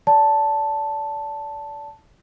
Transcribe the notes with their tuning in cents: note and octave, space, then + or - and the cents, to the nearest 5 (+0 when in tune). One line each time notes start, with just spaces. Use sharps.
D5 -30 A5 +0